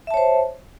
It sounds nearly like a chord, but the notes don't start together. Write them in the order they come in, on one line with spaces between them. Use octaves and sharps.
E5 A5 C#5 C5